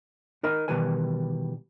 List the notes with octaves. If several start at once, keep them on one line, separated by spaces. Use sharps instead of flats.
D#4 A#4 D#5 B5
B2 D#3 E3 G3 B4 G#5